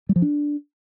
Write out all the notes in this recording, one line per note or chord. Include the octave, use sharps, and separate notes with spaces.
G3
F3
D4